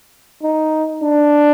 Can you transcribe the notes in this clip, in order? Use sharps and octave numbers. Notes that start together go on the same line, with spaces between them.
D#4
D4